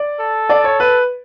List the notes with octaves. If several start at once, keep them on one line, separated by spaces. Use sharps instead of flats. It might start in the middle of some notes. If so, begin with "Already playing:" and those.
Already playing: D5
A4
D5
C#5
B4